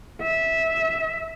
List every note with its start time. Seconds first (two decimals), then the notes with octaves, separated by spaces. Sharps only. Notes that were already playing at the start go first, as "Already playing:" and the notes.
0.21 E5